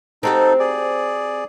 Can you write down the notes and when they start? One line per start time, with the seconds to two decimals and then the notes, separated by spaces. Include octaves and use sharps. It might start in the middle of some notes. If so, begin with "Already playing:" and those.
0.23 C4 D#4 F#4 G4 A4
0.59 G#4 D5